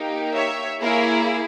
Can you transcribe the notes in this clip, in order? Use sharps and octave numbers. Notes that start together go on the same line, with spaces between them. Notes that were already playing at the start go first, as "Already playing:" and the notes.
Already playing: A#3 D#4 G4
C#5 E5
A#3 E4 G#4 A#4 C#5